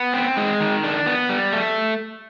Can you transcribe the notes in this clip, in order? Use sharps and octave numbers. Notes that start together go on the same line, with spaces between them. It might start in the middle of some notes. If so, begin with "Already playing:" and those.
Already playing: B3
C4
G#3
D#3
D4
B3
G3
A3